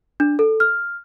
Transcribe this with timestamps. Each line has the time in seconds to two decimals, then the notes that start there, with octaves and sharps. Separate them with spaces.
0.20 D4
0.39 A4
0.60 F6